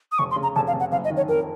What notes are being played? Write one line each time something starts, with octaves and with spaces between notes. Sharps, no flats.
D#6
F1 C#6
C6
C#3
A#5
F1 A5
F5
F1
F#5
F#1 F5
D#5
D#3
C#5
F2 A#4